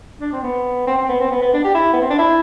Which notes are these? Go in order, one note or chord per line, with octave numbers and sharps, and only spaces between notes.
D4
C4
B3
C4
C4
B3
C4
B3
B3
D4
G4
E4
B3
C4
D4
E4